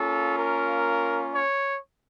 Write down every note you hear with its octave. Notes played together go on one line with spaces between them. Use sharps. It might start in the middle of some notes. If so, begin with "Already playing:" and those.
Already playing: A#3 C#4 F4 A4
A#4
C#5